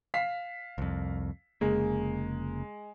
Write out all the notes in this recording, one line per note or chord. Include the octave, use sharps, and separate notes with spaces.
F5 B6 C7
C2 F2
F1 C#3 G#3 A#3